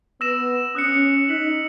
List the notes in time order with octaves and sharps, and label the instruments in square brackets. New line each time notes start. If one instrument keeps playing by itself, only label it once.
[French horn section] B3 [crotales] E6 A#6 E7
[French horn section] C#4 [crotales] D#6 F#6 C#7
[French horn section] D#4 [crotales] F#6 B6 F#7